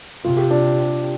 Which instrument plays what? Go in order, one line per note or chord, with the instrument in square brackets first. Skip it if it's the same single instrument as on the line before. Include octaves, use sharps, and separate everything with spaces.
[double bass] C3 [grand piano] F4
[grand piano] G4
D4 F4